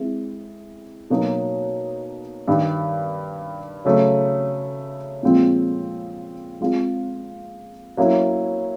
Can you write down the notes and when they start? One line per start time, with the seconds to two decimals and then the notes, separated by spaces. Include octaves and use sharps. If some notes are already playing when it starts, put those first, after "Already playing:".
Already playing: G#3 C4 E4
1.10 B2 F#3 A#3 D#4
2.48 G2 D#3 G3
3.85 C#3 F#3 A3
5.23 A#2 F3 G#3 C4
6.61 G#3 C4 F4 G#4
7.97 F#3 A#3 C#4 E4